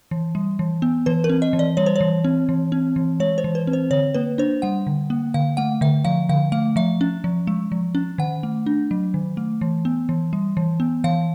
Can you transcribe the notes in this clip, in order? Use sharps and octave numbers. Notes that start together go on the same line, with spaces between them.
E3
G3
E3
B3
E3 B4
A#4
C4
D#5
E3
D5
G3 C#5
C5
C#5
E3
C4
E3
C4
E3
G#3 C#5
C5
E3
B4
C4
C5
D3 C#5
A#3 B4
D4 C5
G3 F#5
D3
A#3
D3 F5
A3 F#5
D3 E5
F3 F5
D3 F5
A3 F5
F3 E5
C#4
F3
G#3
F3
C#4
D#3 F#5
A3
D4
F#3
D#3
A3
E3
B3
E3
G3
E3
B3
E3 F5